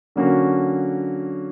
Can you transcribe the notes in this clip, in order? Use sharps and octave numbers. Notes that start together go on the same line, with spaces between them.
D3 F#3 A#3 C#4 F#4